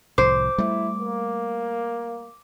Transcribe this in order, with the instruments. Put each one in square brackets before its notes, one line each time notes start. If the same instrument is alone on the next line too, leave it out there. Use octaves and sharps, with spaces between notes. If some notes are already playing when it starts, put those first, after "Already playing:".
[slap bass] C2 A2 F3 [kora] C5 [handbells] D6
[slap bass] G3 A3 [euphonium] E4
[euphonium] A#3